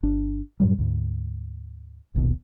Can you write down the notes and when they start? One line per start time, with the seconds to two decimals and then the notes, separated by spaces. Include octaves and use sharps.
0.03 G1 D4
0.60 F#2 A2 F#3 G3
0.78 D2 G#2
2.14 D1 A#1 D#2 B2